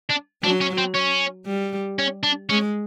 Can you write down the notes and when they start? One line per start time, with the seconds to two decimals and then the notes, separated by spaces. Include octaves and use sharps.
0.10 D4
0.43 F#3 D4
0.61 C#4
0.78 C4
0.95 C#4
1.46 G3
1.99 C#4
2.23 D4
2.49 G#3 C#4